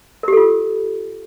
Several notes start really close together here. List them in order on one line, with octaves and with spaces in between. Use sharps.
A#4 G4 A4 F4